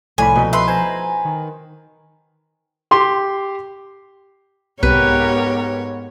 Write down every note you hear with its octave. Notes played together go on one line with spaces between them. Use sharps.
C2 A2 F3 D5 G#5 B5
B2 D#4
B4 E5 C6 C7
C5 G#5 A#5
D#3
G4 C6
C2 G#2 B3 G4 A#4 B4 C#5